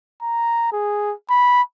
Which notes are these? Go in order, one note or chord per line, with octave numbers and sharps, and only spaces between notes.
A#5
G#4
B5